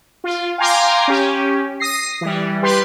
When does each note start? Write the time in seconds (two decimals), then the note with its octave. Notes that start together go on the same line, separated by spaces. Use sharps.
0.24 F4
0.58 F5 G5 G#5 A#5 C6 D6
1.08 C#4 G4
1.80 D#6 A#6 C7
2.21 E3 G3
2.62 G3 G4 B4 C6